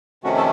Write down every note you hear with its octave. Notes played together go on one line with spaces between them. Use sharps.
F2 C3 D#3 A3 C#4 F#4
A4